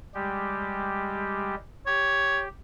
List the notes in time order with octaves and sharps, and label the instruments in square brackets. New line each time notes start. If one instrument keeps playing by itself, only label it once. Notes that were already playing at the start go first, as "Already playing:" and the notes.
[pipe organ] G3 G#3 G4
[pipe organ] G4 [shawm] C#5